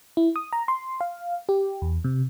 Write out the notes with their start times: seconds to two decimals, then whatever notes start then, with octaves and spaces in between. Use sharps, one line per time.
0.17 E4
0.36 D#6
0.53 A#5
0.68 C6
1.01 F5
1.49 G4
1.82 E2
2.04 C3